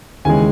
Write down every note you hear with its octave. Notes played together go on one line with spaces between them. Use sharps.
D#2 C#3 E3 G#3 G#5